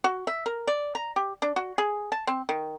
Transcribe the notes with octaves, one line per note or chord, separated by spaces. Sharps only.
F#4
E5
A#4
D5
A#5
G4
D4
F#4
G#4
A5
C4
D#3